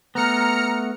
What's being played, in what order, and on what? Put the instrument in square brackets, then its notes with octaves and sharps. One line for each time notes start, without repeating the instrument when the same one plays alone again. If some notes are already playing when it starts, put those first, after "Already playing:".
[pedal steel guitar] A3 B3 [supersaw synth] A#5 F6 C#7